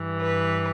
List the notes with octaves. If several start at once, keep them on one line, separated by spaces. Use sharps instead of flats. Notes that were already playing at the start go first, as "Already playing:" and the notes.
Already playing: G2 E3
B4